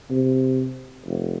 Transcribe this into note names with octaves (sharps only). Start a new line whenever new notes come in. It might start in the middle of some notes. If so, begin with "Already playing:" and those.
C3
F1